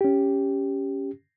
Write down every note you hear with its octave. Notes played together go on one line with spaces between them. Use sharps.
C#4 G4